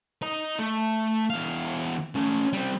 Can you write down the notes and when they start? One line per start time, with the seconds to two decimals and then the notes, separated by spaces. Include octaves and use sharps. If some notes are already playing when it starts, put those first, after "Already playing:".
0.23 D#5 A#5
0.59 A3
1.30 E2 F5
2.15 A3 C#4
2.53 G3 C4